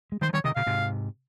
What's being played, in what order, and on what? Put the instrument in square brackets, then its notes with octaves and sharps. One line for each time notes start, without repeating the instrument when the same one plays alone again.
[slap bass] G#3
[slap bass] D#3 G3 [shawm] C5
[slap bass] F3
[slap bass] D#3 G3 [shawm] C#5
[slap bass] C3 D#3 [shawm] D#5
[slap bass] A#2 C#3 [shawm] F5
[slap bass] G#2 C3